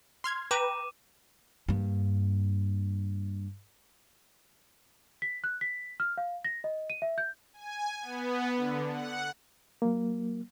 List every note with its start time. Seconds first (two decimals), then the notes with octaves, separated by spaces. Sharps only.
0.24 C6 F6 G#6
0.51 B4 G5 A#5 D6 D#7 E7
1.69 G2 A#3
5.22 B6
5.44 F#6
5.61 B6
6.00 F6
6.18 F5
6.45 A#6
6.64 D#5
6.90 D#7
7.02 E5
7.18 G6
7.54 G#5
8.01 B3
8.56 D3
8.90 F#5
9.82 F#3 A#3